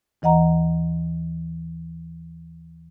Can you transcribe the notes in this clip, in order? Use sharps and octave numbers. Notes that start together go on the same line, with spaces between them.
D#2 E3 D#5 F#5 A#5